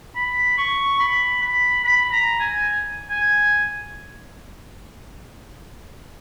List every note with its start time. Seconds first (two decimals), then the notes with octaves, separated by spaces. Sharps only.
0.16 B5
0.58 C#6
1.00 B5
1.42 B5
1.84 B5
2.12 A#5
2.40 G#5
3.10 G#5